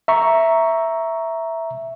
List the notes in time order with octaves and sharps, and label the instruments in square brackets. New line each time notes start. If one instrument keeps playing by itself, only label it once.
[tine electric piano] E5 A#5 C#6